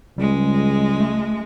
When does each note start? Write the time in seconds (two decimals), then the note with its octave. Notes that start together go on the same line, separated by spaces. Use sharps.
0.18 C#2 G3 G#3
1.00 A3